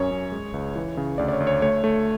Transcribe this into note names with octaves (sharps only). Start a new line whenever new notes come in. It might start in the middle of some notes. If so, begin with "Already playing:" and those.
Already playing: F#2 C#4 C#5
F#2
G#3
C#2
E3
C#3
D2 D5
D5
C#5
D2
C#5
A3 C#5
A3